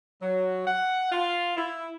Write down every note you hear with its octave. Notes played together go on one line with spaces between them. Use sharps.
F#3
F#5
F4
E4